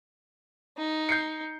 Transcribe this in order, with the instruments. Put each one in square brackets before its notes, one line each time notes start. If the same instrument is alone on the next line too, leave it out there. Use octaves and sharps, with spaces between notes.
[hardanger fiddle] D#4
[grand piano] G6 C7 C#7